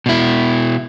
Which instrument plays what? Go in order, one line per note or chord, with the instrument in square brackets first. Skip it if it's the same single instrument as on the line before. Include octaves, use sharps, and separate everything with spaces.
[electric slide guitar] B2 E4